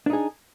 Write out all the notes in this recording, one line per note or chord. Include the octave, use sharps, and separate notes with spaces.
D4 D#4 G#4